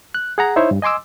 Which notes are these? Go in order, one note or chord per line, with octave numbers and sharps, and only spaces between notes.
F#6
G#4 F#5 A#5
D#4 E4 C5 C#5 E5
G2
D#5 G#5 C6 D6 E6